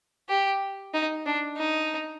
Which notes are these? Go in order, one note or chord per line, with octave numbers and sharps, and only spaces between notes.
G4
D#4
D4
D#4